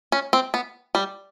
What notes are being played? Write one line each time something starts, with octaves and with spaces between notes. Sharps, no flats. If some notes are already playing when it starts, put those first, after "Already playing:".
C#4
C4
B3
G3